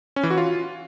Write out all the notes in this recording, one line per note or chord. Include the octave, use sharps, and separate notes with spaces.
C#4
E3
F#4
F4